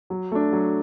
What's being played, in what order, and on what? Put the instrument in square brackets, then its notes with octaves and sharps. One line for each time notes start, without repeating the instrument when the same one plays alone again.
[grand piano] F#3
A3 D4
F#3